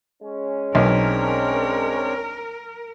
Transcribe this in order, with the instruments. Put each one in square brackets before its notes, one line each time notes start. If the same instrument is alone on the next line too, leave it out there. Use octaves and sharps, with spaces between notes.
[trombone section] G#3 C#4
[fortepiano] B1 [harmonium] C4 D4 C#5 [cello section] A#4